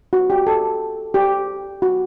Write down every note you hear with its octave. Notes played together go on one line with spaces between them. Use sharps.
F#4
G4
A4
G4
F#4